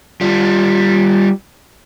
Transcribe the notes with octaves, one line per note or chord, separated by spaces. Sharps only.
G3 F4